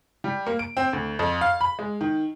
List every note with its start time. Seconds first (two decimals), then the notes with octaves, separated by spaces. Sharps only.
0.24 G3
0.47 A#3
0.59 D7
0.77 C4
0.93 D2
1.19 F2
1.41 F5
1.61 B5
1.79 G#3
2.01 D#3